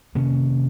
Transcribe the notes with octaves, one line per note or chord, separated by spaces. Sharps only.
C3 D#3 A#3 C#4